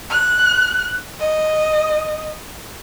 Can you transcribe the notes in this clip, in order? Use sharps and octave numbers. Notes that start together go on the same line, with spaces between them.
F#6
D#5